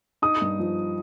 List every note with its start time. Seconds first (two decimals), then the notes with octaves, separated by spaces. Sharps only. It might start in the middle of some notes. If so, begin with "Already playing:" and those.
0.22 D#4 D#6
0.42 G2
0.59 F3